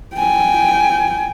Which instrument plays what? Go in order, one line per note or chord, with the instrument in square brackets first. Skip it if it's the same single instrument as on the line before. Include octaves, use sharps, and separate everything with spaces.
[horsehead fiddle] G5 G#5